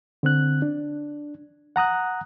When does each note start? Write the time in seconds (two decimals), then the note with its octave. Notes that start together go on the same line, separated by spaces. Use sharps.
0.23 D3 C4 F#6
0.62 D4
1.76 F#5 A#5 D#6 F#6